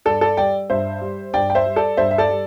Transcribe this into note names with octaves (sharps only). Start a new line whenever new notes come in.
G2 A4 D5
A4 D5
G3 D5 G5
G2 C5 E5
G3
G2 D5 G5
G5
C5 E5
G3
A4 D5
G2 C5 E5
E5
A4 D5
G3